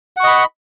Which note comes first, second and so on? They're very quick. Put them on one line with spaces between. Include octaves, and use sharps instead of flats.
F#5 C#6 D#5 B5